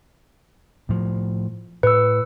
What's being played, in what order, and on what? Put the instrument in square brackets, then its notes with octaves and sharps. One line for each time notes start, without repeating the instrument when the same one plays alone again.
[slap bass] A2 F3
[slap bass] A2 [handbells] B4 E6